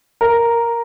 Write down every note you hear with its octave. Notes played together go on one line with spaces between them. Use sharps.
A#4